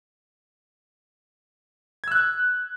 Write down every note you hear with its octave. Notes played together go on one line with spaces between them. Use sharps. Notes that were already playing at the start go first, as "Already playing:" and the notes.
E6 F#6 G#6